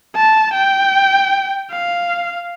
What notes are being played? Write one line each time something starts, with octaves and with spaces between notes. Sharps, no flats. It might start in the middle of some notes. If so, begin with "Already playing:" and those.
A5
G5
F5